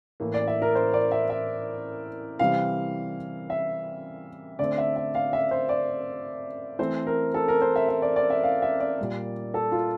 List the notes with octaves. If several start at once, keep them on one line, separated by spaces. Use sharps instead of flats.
A2 E3 A#3
D5
E5
A#4
C5
D5
E5
E5
C3 E3 G3 C4 F5
E5
D3 A3 C4 D5
E5
E5
F5
E5
C5
D5
E3 A3 C4 C5
A#4
A4
A#4
C5
E5
E5
D5
D5
E5
F5
E5
D5
A#2 G3 A#3
A4
F4